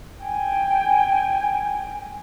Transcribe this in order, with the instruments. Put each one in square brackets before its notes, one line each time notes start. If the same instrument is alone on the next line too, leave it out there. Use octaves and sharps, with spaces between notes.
[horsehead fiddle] G5 G#5